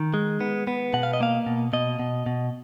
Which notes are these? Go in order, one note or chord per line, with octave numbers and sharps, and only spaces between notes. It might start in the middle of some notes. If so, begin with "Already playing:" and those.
Already playing: D#3
G#3
B3
B3
B2 F#5
F5
D#5
A#3 F5
B2
B2 D#5
B2
B2